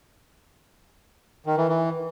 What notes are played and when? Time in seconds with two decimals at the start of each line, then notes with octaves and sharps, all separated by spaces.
1.46 D#3
1.57 E3
1.69 E3